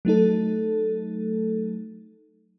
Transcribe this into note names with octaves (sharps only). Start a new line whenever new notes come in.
F#3 A3 D#4 A4